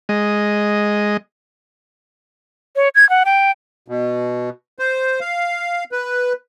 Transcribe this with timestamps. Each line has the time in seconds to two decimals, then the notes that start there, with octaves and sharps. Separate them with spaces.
0.09 G#3 D#5
2.76 C#5
2.95 G#6
3.10 F#5
3.25 G5
3.88 B2
4.79 C5
5.21 F5
5.92 B4